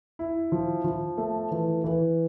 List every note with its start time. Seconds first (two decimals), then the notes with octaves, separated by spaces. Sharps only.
0.19 E4
0.52 F3
0.84 F3
1.18 A3
1.51 E3
1.84 E3